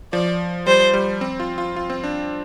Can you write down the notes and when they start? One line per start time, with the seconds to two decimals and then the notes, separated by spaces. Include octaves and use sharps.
0.13 F3 D5
0.67 G3 C5
0.94 G3
1.21 C4
1.40 F4
1.58 F4
1.76 F4
1.90 C4
2.04 D4